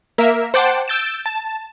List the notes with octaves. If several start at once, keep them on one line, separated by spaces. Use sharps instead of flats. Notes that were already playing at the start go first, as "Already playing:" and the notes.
A#3 A#4 E5
C5 F#5 G5 A5 D6
E6 G6 A6 D7 E7
A5